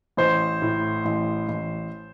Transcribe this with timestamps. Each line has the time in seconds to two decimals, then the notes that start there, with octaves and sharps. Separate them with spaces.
0.17 A1 C5
0.62 A2
1.05 A1
1.49 A1